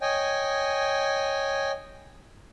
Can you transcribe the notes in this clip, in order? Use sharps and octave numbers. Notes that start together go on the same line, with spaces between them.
C#5 D#5 G5 G#5